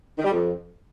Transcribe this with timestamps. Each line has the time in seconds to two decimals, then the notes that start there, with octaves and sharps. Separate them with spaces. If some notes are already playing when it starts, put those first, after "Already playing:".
0.18 D#3
0.25 G3
0.31 F2